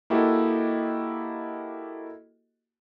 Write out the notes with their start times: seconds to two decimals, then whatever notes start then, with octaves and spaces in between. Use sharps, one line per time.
0.10 A#3 E4 F#4 G4 A4 D#5